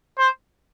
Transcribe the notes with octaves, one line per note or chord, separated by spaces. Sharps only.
C5